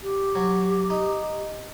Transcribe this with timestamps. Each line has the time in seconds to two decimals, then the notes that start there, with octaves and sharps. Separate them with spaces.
0.02 G4
0.35 F#3
0.90 D#4